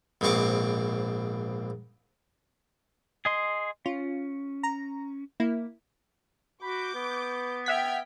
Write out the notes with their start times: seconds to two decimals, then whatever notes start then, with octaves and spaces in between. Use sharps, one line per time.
0.21 A#1 G#2 B2 C4 C#6 D6
3.25 G#4 D#5 C6
3.86 C#4 F4
4.63 A#5
5.40 A#3 E4
6.62 F#4 B5 D6 G6
6.95 B3 B4
7.66 E5 F#5 G5 F6 G#6 B6